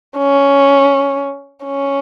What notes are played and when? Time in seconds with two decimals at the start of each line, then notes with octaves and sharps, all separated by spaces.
0.18 C#4
1.65 C#4